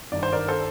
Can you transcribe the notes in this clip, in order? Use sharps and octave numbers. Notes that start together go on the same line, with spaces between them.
G1 G2 D#3 D5
C5
A#4 D5
A4 C5